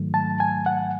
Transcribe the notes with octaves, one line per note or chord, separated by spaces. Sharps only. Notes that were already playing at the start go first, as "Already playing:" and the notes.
Already playing: G#2 D#3 F#3 A3
A5
G#5
F#5